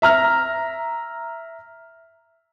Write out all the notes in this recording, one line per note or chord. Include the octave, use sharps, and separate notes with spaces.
E5 A#5 F6